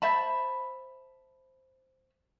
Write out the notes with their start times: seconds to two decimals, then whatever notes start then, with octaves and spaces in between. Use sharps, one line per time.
0.02 C5 E5 A5 B5